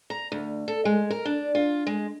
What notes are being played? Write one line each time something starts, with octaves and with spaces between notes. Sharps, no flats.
A#5
D2
A4
G#3
A#4
D4
F4
G#3